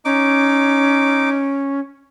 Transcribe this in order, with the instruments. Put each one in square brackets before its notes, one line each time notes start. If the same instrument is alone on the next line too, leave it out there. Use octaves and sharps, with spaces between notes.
[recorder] C#4 [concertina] D#4 D6